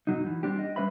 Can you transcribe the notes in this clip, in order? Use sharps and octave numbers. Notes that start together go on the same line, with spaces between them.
F#2 B2 F#3 D#4
E3
G3 C4 D4 G4
D#5
G3 C#4 B4 C5 E5 B5